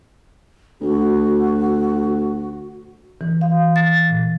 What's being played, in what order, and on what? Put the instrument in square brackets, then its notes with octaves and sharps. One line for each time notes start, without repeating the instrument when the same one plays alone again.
[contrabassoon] D2 [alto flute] F#4
[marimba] E3
F5
A6
A#2